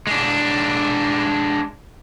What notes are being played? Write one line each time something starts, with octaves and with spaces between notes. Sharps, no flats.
G#3 D4